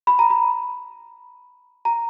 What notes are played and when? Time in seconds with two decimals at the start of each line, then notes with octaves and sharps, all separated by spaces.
0.07 B5
0.19 A#5
0.30 B5
1.85 A#5